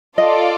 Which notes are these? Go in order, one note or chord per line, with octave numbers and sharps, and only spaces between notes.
F4 A4 D5 D#5